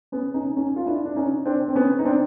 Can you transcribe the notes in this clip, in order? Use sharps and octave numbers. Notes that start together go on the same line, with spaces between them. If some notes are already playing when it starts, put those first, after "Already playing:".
B3 C#4
C#4 D#4
C#4 D#4
F4
D4 E4
D4
C#4 D#4
C4 D4
C4
B3 C#4
D#4
C4 D4